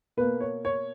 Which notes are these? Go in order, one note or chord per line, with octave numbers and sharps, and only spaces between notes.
B2 A#3 B4
C#5
C#5